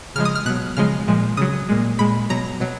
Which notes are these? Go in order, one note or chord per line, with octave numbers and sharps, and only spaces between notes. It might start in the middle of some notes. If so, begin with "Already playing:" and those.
C#3 F3 G#3 F6
D#6
F6
B2 F#3 F#6
C#3 F3 G#3 F6
A#2 F3 G#3
C#3 F#3 D#6
A#2 G#3
A#2 G#3 B5
B2 F#3 A#5
B2 F#3